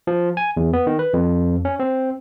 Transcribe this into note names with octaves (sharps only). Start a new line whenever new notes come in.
F3
G#5
E2
B3
D#3
B4
F2
C#4
C4